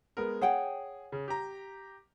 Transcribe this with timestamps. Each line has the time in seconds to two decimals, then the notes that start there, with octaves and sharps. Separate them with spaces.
0.17 G#3 B3 A#4
0.41 G#4 C#5 F#5 G5
1.12 C#3
1.28 G4 A#5